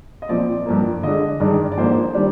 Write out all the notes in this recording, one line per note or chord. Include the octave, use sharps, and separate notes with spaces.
D#5
A#2 F3 C4 D5
G2 F3 A#3
D3 G#3 D4 D#5
G2 D#3 G#3 D4 D5
D5
G#2 F3 A#3 D4 C5
D#3 G3 D4